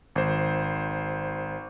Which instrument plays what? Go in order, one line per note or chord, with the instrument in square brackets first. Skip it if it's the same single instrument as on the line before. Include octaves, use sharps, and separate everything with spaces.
[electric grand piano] G#1 C5